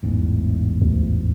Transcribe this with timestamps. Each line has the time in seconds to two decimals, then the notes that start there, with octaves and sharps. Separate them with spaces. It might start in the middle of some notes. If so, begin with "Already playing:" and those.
0.03 A1 E2 G#2
0.82 D2